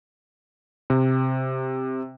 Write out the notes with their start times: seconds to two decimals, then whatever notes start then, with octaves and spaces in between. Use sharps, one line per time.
0.90 C3